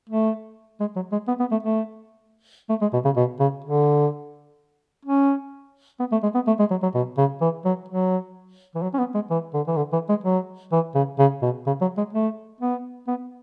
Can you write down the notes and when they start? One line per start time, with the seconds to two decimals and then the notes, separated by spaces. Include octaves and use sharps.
0.09 A3
0.81 G#3
0.96 F#3
1.12 G#3
1.28 B3
1.40 B3
1.51 A3
1.63 A3
2.70 A3
2.82 G#3
2.93 B2
3.05 C#3
3.17 B2
3.40 C#3
3.64 D3
5.05 C#4
6.00 B3
6.12 A3
6.23 G#3
6.35 B3
6.47 A3
6.59 G#3
6.71 F#3
6.83 F#3
6.95 B2
7.18 C#3
7.41 E3
7.65 F#3
7.89 F#3
8.75 E3
8.83 F#3
8.94 C#4
8.99 B3
9.15 G#3
9.30 E3
9.54 D3
9.68 E3
9.77 D3
9.93 E3
10.09 G#3
10.24 F#3
10.72 E3
10.95 C#3
11.19 C#3
11.42 B2
11.67 C#3
11.82 F#3
11.98 G#3
12.13 A3
12.61 B3
13.08 B3